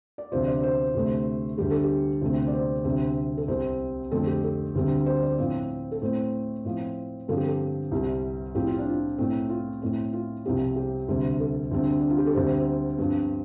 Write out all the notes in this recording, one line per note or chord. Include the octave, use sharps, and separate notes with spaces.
D5
D2 C3 F3 C5
D5
C5
D2 C3 A3
D2 D3 G3 G4
A4
G4
D2 C3 A3 C4
D5
C5
D2 C3 G3 C4
A4
C2 C3 G3 C4 C5
F2 D3 A3 C4 A4
G4
A4
D2 D3 G3 C4
C5
D5
A2 F3 C4
A4
A2 A3 C4 C5
A2 F3 C4
G2 D3 F3 C4 A4
G4
A4
C2 C3 G3
A2 F3 C4 G4
F4
D4
F4
A2 A3 C4
F4
A2 A3 C4
F4
C2 C3 F3 C4 G4
G4
D2 C3 G3
A4
D2 D3 G3 C4
D4
F4
G4
A4
D2 D3 G3 C4 C5
G2 F3 C4